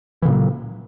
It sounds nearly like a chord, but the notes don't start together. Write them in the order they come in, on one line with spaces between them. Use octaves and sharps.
E3 C#3 A#2 F#3